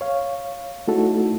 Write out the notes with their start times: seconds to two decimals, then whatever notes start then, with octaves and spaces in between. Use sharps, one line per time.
0.01 C#5 F5
0.88 A3 D#4 E4 F#4 A4